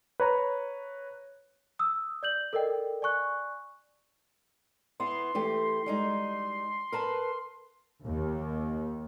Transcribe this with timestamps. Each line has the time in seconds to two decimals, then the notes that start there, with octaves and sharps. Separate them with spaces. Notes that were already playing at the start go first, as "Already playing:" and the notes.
0.20 B4 C#5 A#5
1.79 D#6 E6
2.23 D5 G6 F#7
2.53 A4 A#4 D5 D#5 G5
3.02 D5 G#5 C#6 F#6
5.00 B3 E4 C6
5.35 E3 A3 G4
5.86 G3 G#3 D#4
6.92 A#4 B4 A5
8.05 D#2